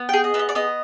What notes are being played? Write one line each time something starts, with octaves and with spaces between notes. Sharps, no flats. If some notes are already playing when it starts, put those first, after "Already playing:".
Already playing: B3
G#4 G5
D#5
B3 E5
D#5
D5
B3 D#5